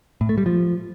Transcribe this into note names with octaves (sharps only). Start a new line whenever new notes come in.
A2
A3
G3
F3